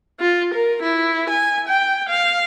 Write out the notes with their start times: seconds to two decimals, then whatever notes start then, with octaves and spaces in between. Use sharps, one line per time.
0.20 F4
0.54 A#4
0.83 E4
1.30 G#5
1.68 G5
2.09 F5